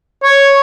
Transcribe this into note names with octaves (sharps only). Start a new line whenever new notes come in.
C#5